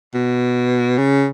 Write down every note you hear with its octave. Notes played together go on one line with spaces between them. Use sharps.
B2
C#3